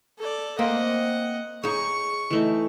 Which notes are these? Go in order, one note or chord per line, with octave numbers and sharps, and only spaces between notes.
A4 D5
A#3 C4 D#5 F#5
D#4 G#4 C#5 C#6
E3 A3 D#4